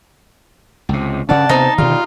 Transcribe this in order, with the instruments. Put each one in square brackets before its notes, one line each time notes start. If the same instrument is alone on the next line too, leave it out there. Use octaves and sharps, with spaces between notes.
[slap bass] C#2 C3
[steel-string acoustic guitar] G2 D5 F#5 [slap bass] C#3 C#4 [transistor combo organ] A5
[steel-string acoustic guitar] E2 C5 A#5 [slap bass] C3 B3 [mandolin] D#4
[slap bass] B2 D3 D#3 [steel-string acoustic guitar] G3 G4 [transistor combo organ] F4